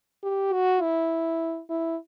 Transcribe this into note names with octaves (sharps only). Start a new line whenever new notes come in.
G4
F#4
E4
E4